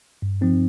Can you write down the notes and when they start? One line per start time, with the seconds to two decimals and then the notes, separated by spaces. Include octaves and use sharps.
0.22 G2
0.41 F3 C4 D#4